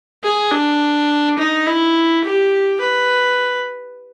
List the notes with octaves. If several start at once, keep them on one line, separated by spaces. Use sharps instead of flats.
G#4
D4
D#4
E4
G4
B4